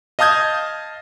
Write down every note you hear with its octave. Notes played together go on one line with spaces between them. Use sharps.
D#5 F5 A5 D#6 G6 G#6